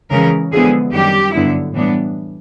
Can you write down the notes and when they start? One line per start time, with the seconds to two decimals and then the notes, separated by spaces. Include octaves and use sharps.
0.11 C#3 E3 G#3 C#4 A#4
0.52 D3 F3 G#3 B3 E4 G#4
0.93 F#2 D#3 G3 G4
1.33 G2 D3 F#3 B3 E4
1.74 A2 E3 G3 B3 D4